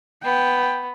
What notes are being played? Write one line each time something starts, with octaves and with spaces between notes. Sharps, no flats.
B3 G5